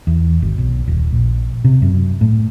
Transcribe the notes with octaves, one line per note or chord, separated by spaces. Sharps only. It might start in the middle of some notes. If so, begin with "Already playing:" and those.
E2
G#1
B1
D#1
A#1
C3
F#2
A2